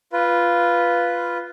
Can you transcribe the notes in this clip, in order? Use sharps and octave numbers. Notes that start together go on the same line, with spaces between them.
F4 B4